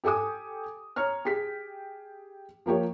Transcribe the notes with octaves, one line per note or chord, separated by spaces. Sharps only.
G4 A4 G#5 D6 D#6
C#5 A#5 F6
G4 G#4 B6
F3 A#3 G4 C#5